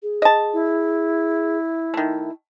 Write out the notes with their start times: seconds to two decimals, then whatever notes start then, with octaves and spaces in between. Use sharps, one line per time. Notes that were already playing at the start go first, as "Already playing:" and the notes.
0.03 G#4
0.22 D#5 A5
0.53 E4
1.94 D#3 A3